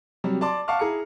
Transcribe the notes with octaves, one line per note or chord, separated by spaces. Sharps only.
C3 F#3 G3
D5 A5 C6 D6
F5 F#5 A5 C#6 D6 F6
E4 G#4 A#5 C#7